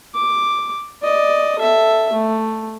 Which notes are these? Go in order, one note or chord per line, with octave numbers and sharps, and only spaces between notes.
D6
D5 D#5
A4 E5
A3